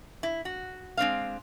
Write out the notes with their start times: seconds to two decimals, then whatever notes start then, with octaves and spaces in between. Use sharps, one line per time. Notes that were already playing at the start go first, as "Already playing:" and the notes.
0.23 E4
0.45 F#4
0.97 G#3 C4 D4 F5